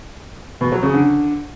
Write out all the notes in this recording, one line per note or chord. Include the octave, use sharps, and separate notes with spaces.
B2
F#3
C#3
D3